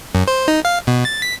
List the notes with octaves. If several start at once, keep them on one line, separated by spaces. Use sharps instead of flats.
F#2
C5
D#4
F5
B2
A6
B6